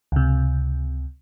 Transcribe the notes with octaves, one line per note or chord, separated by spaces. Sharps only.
C#2 C3